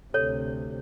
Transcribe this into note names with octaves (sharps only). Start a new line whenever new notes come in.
D2 C3 A4 C#5